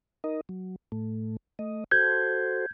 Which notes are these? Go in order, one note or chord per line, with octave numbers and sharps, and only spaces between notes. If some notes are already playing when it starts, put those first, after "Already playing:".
D#4 A#4 D#5
F#3
A2 A3
A3 D#5
F#4 A4 C5 G6 G#6